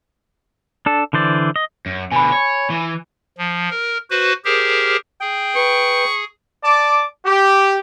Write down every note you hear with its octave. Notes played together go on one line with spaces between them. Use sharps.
D4 A4
D3 E3 C5 D5
D#5
F#2
B2 D3 G#5 B5
C#5
E3
F3
A#4
F#4 B4 C5
G4 G#4 A#4 C5
G#4 G5
B4 C#6
D5 A5 D6
G4